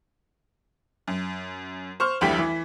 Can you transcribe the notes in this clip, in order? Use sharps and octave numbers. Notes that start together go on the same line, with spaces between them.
F#2
C5 C#6 F6
F1 D2 E3 G3 G5 B6
E3